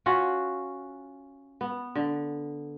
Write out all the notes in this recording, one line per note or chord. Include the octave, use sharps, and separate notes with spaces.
C#4 F4 F#4 F#5
B3
D3